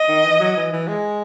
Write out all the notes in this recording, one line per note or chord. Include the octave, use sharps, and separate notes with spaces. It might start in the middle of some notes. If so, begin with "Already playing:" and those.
Already playing: D#5
D#3
E3
F#3
E3
E3
G#3